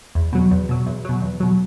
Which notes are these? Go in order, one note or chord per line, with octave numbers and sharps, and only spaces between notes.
E2
B2 F#3
E2
B2 F#3
E2
B2 F#3
E2
B2 F#3